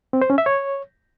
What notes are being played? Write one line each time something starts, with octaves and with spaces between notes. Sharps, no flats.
C4
C5
C#4
E5
C#5